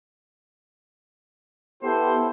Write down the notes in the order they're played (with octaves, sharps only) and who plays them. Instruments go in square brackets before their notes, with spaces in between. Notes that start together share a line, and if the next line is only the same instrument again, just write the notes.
[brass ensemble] B3 G4 C5 [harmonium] E4 A4